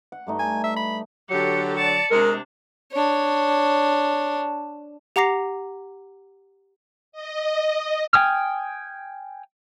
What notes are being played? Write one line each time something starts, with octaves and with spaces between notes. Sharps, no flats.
F#5
G2 A3 D#4
G#5
E5
B5
D3 F#3 G4 A4 C#7
D5 A5 C#7
C3 G#3 D4 A#4
D4 C#5
G4 F#5 A#5 D6 A#6 C7
D#5
G5 G#5 D#6 F6